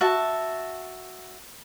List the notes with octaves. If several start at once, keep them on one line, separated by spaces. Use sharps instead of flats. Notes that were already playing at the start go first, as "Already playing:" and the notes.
F#4 E5 A5